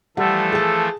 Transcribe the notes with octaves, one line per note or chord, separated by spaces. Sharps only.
E3 F3 G3 A3 A4 F#5
G#4 A5